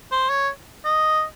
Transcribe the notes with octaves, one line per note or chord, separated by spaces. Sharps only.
C5
C#5
D#5